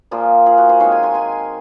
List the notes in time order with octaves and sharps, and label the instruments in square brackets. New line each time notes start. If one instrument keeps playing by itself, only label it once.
[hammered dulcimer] A#2 F3 A#3 F4 G#4
F4 G#4
F#4 A#4
G#4 C5
D#3 G#3 C4 C#5 F5
G#5 C6
G#5 C6
G#5 C6